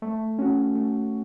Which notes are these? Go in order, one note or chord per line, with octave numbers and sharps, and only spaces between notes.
A3
C#4 F#4
A3